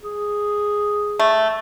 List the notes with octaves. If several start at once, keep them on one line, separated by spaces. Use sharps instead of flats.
G#4
A3